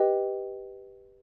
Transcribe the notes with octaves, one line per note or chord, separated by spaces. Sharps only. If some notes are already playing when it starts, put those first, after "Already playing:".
Already playing: G4 B4 D#5 G5